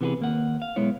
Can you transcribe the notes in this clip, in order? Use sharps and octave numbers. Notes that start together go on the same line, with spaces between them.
C3 E3 B3 G4 G#4 B4
D#2 A#3 F#5
F5
B1 G#3 B3 E4 C#5